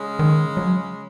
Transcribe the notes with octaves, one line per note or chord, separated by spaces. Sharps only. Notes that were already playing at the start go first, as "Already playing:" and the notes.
Already playing: C#3 G#3 C#4
D#3
F#3